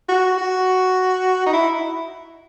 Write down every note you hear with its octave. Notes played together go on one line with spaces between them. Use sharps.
F#4
F#4
D#4
E4